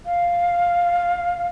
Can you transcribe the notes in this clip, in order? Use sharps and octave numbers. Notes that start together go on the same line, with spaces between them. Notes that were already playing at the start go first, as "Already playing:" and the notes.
F5